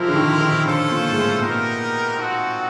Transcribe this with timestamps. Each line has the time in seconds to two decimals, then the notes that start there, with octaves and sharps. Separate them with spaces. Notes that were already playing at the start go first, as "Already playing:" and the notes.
Already playing: F3 G#3 C4 E4 G4 A#4
0.08 D3
0.16 D#3
0.41 D#3
0.65 D3 C#4 F4 A4 C5
0.91 A#2
1.12 G#2
1.16 A2
1.41 A#2 B3 D#4 G4 A#4
2.16 C4 D#4 F#4 A4